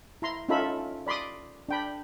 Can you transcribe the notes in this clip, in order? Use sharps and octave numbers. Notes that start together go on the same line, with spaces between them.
E4 A#5 C6
C#4 D#4 F4 A4 E5 B5
D5 B5 C6 D6 D#6
D4 G5 B5